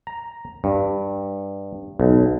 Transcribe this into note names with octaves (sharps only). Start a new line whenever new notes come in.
A#5
G2
B1